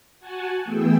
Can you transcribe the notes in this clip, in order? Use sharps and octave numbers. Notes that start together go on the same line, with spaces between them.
F#4 F#5 G#5 A5
E3 A3 B3 G#4 G5 E6